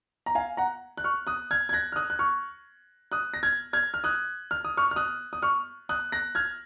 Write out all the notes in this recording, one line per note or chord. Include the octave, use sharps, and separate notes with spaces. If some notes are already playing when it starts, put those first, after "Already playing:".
A#5
F5 G#5
F#5 A#5
F#6
C#6 F6
D#6 F#6
F6 G#6
G#6
F#6 A#6
F6
D#6 F#6
F#6
C#6 F6
D#6 F#6
A#6
F6 G#6
F6 G#6
F6
D#6 F#6
F6
D#6
C#6 F6
F6
D#6 F#6
D#6
C#6 F6
D#6 F#6
F#6 A#6
F6 G#6